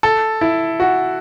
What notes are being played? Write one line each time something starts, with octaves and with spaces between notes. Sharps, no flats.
A4
E4
F#4